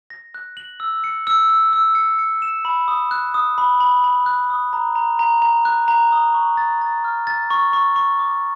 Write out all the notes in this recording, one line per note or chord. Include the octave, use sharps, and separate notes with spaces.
A#6
F#6
F#7
E6
C#7
E6
E6
E6
C#7
C#7
E7
B5
D#6
F#6
D#6
B5
B5
B5
F#6
D#6
A#5
A#5
A#5
A#5
F#6
A#5
D#6
C#6
A6
A6
F6
A6
C#6
C#6
C#6
D6